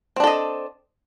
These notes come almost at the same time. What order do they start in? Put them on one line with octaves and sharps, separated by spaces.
C4 D4 A4 D#5